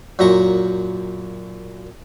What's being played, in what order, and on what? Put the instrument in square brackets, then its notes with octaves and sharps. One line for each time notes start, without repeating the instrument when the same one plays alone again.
[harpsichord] F#2 A#2 F#3 A#5 C#6